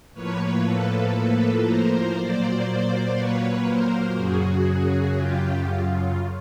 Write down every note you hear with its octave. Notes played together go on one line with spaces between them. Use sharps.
A2 F3 A#3 B4 C#5
A4 B4
A4 B4
A#4 C5
A#2 F#3 A#3 C5 D5
B4 C#5
A#4 C5
F#2 C#3 F#3 F#4 G#4
F4 G4
F4